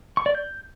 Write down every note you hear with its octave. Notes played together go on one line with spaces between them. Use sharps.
C#6
D5
G6